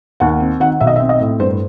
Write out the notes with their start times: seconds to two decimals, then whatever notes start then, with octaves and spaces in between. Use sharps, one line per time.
0.20 D#2 F#5
0.40 C4
0.60 D#3 F#5
0.81 B1 E5
0.87 D#5
0.96 E5
1.00 C4
1.09 D#5
1.20 A2
1.40 G2 C5